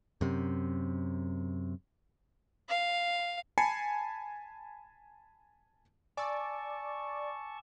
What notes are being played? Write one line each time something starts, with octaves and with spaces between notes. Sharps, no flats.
F#2 C3
F5
G#5 A5 B5 C7 C#7
D5 G#5 A5 C#6 D6 E6